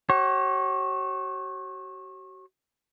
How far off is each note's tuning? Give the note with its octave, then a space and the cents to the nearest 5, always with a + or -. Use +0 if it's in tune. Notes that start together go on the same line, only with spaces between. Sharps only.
F#4 +40 C#5 -35